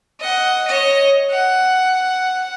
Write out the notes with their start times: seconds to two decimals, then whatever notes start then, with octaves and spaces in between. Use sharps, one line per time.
0.20 D#5 F#5
0.67 C#5 D#5
1.31 F#5